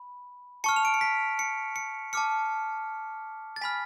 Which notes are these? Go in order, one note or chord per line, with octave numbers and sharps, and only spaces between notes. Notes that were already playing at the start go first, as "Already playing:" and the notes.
Already playing: B5
A5 C#6 F6 C#7
F7
D7
C#7
B6
C#7
C#7
A5 D6 F6 C#7
A6
G#5 B5 F6 B6